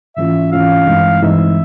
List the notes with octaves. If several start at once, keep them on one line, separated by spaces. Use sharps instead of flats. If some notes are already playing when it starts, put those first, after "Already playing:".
G#2 E3 A3 C#4 F4 E5
G#2 E3 A3 C#4 F4 F5
G2 E3 G#3 C4 D#4
G2 E3 G#3 C4 D#4 E5